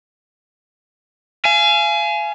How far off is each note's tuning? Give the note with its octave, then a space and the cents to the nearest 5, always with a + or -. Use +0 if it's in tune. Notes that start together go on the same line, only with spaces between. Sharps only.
F5 -35 G#5 +20